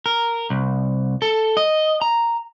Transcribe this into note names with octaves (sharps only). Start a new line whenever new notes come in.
A#4
C2
A4
D#5
A#5